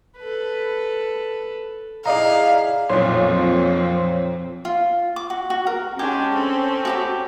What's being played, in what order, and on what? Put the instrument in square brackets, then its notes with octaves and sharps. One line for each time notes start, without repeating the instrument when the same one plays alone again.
[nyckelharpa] A4 B4
[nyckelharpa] E4 G#4 [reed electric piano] D5 D#5 A#5 [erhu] F5
[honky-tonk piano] B1 A#2 [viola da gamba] F2 C4 [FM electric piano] C#5 C6
[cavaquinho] F4
D6
F#4
F#4
A#4
[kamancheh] G#3 D4 [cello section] C#4 [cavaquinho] G4 G#5
[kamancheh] C4 A4
[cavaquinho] F#4 G4 B5